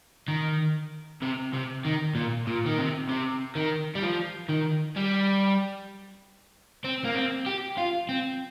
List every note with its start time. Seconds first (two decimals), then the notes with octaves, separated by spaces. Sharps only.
0.28 D#3
1.22 C3
1.53 C3
1.85 D#3
2.15 A#2
2.47 A#2
2.66 D#3
2.78 C3
3.09 C3
3.56 D#3
3.95 G3
4.03 F3
4.49 D#3
4.96 G3
6.84 C4
7.05 A#3
7.15 C4
7.46 G4
7.78 F4
8.09 C4